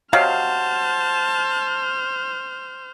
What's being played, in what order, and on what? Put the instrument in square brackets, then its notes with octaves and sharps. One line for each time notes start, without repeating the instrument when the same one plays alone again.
[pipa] C3 F#3 [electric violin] C5 F6 [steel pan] D#5 F5 [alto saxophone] A5